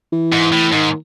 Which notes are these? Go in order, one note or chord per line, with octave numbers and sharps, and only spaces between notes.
E3
G#2
A2
G#2 D#3